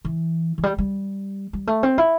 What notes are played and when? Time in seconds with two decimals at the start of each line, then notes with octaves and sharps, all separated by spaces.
0.05 E3
0.58 E3
0.63 G3
0.78 G3
1.53 G3
1.67 A3
1.83 C4
1.98 E4